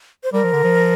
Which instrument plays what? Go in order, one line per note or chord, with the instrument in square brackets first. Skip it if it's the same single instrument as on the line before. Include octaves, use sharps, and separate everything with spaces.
[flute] C5
[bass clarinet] G3 [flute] A#4
[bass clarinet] F3
D3
F3